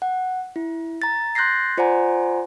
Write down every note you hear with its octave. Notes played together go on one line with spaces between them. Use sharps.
F#5
E4
A#5 A6
C6 F#6 G6 A6 A#6 C7
F4 C5 D5 F#5 G#5 A#5